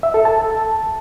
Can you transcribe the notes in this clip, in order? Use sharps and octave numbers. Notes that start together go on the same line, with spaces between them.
E5
A4
A5